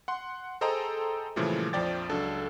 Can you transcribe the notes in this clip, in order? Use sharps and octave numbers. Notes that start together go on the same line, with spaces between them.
F#5 C6
G#4 A4 C5 D#5 G5 A#5
A#2 C#3 E3 F3 G3 A3
A#1 F2 F3 D5 G5 A6
C#2 F#3 D4 A4